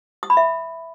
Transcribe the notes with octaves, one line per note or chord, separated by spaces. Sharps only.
D#6
B5
E5